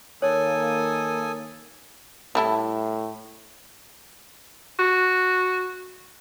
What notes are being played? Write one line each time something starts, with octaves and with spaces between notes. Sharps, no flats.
D#3 A#3 A4 C#5 G#5 D#6
A2 G3 E4 A4
F#4